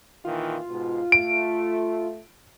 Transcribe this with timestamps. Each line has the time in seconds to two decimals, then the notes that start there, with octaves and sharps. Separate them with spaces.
0.25 A#2 D#3 E3 F4
0.68 G#2 B2
1.12 A3 D7